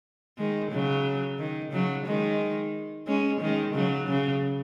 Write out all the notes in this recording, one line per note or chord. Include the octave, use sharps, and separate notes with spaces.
D#3 G#3
C#3 F#3
D#3
C#3 F#3
D#3 G#3
G#3 C#4
D#3 G#3
C#3 F#3
C#3